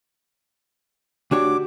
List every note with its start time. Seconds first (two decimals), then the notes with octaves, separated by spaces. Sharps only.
1.31 D2 D4 F#4 G4 C#5 D6